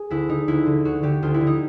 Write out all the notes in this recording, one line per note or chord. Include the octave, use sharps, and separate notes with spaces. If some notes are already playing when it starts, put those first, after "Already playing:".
Already playing: G#4
D2 E4
D3 D#4
D2 E4
D3
D2 F#4
D3 G4
D2 F4
E4
D3
D#4